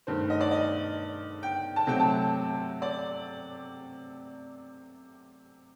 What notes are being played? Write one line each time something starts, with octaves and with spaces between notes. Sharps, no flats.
G2 D#3 A3 C5
D#5
D5
D#5
G5
A5
C3 F#3 A3 C4 G5
A5
D5